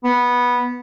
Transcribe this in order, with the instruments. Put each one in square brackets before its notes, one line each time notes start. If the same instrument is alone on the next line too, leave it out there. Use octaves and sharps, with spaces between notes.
[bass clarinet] B3